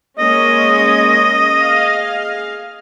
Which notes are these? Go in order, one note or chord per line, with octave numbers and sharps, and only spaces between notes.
G#3 A#3 C#4 D#5
G#4 F5